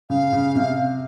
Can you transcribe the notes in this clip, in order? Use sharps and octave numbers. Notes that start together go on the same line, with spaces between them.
C#3 F5
C#3
C3